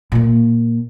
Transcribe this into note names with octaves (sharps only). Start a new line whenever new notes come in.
A#2 A#3